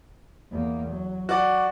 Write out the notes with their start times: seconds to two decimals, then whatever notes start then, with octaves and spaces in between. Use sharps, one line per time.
0.51 E2 A#3
0.89 F#3
1.29 F#4 D5